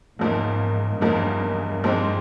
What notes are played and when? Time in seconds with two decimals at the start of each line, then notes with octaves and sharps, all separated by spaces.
0.19 E2 G#2 C#3 F3 A#3 D#4
1.01 E2 G2 C#3 F3 A#3 D#4
1.84 A#2 F3 G#3 C4 D#4